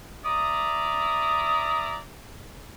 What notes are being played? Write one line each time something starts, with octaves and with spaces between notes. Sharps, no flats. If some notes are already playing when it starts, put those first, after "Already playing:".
D5 E5 A#5 D#6